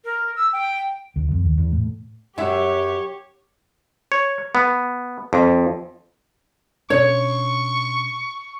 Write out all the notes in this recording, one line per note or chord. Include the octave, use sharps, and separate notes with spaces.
A#4
E6
G5
D2
F2
D#2
E2
A2
F#2 F#3 G4 C#5 E5 F#5
C#5
B3
F2
B2 C#4 D4 C#5 C#6